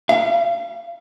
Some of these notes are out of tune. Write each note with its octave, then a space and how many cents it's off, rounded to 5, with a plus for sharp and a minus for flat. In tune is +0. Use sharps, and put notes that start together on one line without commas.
F5 -35